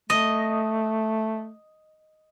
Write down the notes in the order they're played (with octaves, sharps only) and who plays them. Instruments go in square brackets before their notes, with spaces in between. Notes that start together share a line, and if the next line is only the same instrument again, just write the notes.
[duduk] A3 [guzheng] D#5